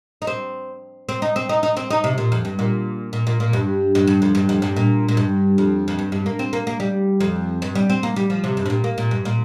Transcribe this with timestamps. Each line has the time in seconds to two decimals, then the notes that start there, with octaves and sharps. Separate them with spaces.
0.22 D#4
0.27 C4
1.09 C4
1.22 D#4
1.36 C4
1.49 D#4
1.63 D#4
1.77 C4
1.90 D#4
2.04 C3
2.18 A#2
2.32 F2
2.45 G2
2.59 A#2
3.13 A#2
3.27 A#2
3.40 A#2
3.53 G2
3.95 G2
4.07 G2
4.22 F2
4.35 G2
4.49 F2
4.62 G2
4.76 A#2
5.09 A#2
5.17 G2
5.58 F2
5.88 F2
5.99 G2
6.12 G2
6.26 A#3
6.39 C4
6.53 A#3
6.67 A#3
6.80 G3
7.20 F2
7.62 G2
7.75 G3
7.90 C4
8.03 A#3
8.16 G3
8.30 F3
8.44 C3
8.57 G2
8.66 C3
8.70 A#2
8.84 A#3
8.98 A#2
9.11 G2
9.25 A#2